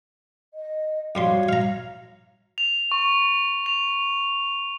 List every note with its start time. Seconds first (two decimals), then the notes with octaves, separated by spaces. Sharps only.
0.54 D#5
1.15 F2 G3 F#4 C#5 F5 C6
1.49 F5 A#5
2.58 F7
2.92 C#6
3.66 F7